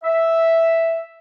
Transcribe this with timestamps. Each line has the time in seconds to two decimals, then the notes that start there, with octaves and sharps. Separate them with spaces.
0.04 E5